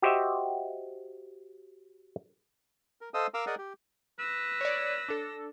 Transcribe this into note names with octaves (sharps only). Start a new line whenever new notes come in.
F#4 G4 C5 D#5 E5
A#4
A4 C5 D#5 F5 D#6 E6
A#4 F5 A#5 D6 E6
G#4 A#4 D5 D#5 F#5 G#5
G4
B4 E6 A#6
C#5 D5
D4 A4